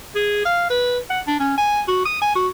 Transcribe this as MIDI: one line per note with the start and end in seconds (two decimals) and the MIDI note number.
0.15 0.44 68
0.45 0.67 77
0.70 0.98 71
1.10 1.20 78
1.27 1.36 62
1.40 1.56 61
1.57 1.82 80
1.88 2.01 66
2.05 2.19 87
2.22 2.35 80
2.35 2.48 66